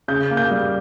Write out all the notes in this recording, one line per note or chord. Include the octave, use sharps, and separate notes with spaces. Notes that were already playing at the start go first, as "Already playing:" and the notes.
C#3 G6
A#3
G6
G3